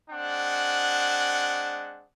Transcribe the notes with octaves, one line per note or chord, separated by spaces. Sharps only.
G#3 C4 D4 F#5